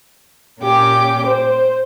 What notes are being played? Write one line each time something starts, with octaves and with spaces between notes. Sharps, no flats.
A#2 A#3 C#4 G4 G5 D6
C5